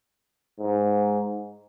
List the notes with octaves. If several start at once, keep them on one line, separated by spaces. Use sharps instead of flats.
G#2